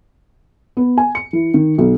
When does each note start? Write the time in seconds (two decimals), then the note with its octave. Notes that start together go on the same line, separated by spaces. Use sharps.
0.77 B3
0.98 G#5
1.15 C#7
1.33 E3
1.54 D#3
1.78 B1